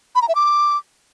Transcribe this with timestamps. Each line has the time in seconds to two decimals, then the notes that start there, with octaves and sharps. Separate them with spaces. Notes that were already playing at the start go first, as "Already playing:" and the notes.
0.15 B5
0.22 A#5
0.29 E5
0.35 D6